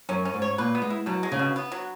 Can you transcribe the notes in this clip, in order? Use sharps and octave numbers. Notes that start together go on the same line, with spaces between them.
F#2 C#4
C#4
G#2
C#5
A#2 B4
B3
G#3
E4
B2 F#3
G#3
C#3
B2
B3
F#3